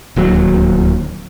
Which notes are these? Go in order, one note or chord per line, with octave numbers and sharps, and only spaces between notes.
D1 D#2 F#3